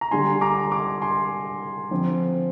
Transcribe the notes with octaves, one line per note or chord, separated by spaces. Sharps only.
A#5
D3 G3 D4 G#5 C6
A#5 D6
A#5 D6
G#5 C6
D3 F3 C4